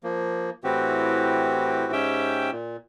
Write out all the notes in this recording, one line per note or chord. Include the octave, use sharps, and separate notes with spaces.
F3 A#3
A2 E3 C4 F#4 G4
G#2 C#4 G4 E5 G5
A#2